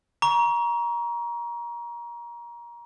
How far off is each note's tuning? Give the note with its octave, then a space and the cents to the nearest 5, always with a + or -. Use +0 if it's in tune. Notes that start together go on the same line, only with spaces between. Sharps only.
A#5 +25 C#6 +30